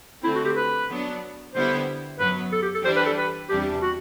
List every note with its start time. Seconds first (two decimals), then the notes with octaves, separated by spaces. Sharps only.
0.23 D3 A3 C4 E4
0.35 F#4
0.45 G4
0.56 B4
0.89 F#3 B3 D4
1.54 D3 G3 B3 E4 C5
2.19 F#2 F#3 B3 B4
2.52 A4
2.62 G4
2.74 A4
2.84 E3 G3 D4 G4 C5
2.96 B4
3.06 A4
3.18 B4
3.49 E2 C3 E3 G3 D4 G4
3.82 F#4